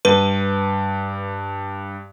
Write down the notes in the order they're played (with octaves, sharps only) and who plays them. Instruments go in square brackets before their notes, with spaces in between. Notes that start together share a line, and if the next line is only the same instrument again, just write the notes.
[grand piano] G2 [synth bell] B4